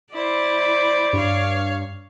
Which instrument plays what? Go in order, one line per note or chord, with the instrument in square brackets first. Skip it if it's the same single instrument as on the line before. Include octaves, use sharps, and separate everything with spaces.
[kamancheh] E4 C5 [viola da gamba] D5
[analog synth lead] G2 [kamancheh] C#5 F5